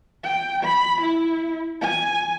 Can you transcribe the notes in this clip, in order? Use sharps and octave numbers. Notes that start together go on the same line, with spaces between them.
G5
B5
E4
G#5